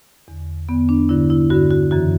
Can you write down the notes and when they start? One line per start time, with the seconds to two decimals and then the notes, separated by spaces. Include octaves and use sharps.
0.28 E2 D3
0.69 E2 D3 B3
0.89 D4
1.09 G2 D3 E4
1.30 E4
1.50 G2 D3 F#4
1.71 F#4
1.91 F#2 C#3 E3 F#4